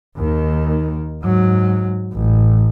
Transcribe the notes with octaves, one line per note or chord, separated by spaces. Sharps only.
D#2 D#3
G#2 F#3
A1